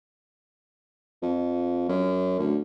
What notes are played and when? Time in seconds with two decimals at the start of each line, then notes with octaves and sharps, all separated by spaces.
1.22 F2
1.88 F#2
2.39 D2